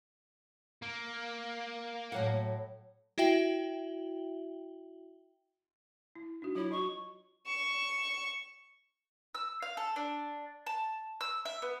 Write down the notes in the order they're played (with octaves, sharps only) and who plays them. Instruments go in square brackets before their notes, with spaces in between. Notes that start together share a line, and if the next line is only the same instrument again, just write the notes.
[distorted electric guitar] A#3
[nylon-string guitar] A2 F#3 F#5
[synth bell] E4 F#4 E5 G5 F#7 G7
[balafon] E4
D4 D#4 F#4
[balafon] F#3 F4 C#5 [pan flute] E4
[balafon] F#4 D#5 [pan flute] C#6
[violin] C#6 E7
[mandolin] E6
F5
A4
D4
A5
E6
E5
B3